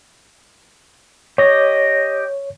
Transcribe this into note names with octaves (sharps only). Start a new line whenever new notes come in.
G4 C#5 D#5